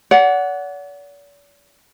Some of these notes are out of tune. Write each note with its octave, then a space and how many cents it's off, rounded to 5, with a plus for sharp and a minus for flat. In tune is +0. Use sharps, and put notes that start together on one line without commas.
D5 -45 F#5 +0